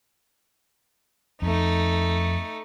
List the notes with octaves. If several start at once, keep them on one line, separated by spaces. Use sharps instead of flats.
F2 A3 D#4